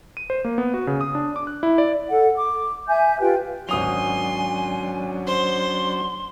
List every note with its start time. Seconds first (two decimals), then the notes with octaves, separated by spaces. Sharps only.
0.17 D#7
0.30 C5
0.45 A#3
0.58 B3
0.74 F#4
0.87 C#3
1.01 D#6
1.15 D4
1.36 D6
1.47 F#6
1.63 E4
1.78 D5
2.09 A4 F#5
2.37 D6
2.88 E5 G#5 G6
3.20 F4 G4 B4 G5
3.69 G#1 F#3 C#4 D4 G#5 C6 D#6 F7
5.27 C5 C6